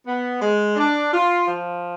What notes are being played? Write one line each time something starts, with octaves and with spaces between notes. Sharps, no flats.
B3
G#3
D4
F4
F3